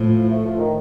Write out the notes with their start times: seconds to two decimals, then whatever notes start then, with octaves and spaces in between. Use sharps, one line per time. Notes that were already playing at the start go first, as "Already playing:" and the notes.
Already playing: A2 F3
0.30 A3
0.44 F3
0.58 D#3